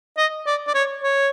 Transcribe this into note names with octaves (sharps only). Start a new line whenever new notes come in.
D#5
D5
D5
C#5
C#5